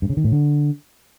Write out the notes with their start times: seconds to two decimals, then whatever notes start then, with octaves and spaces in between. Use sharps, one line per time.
0.02 G2
0.10 C#3
0.17 D#3
0.24 A2
0.32 D3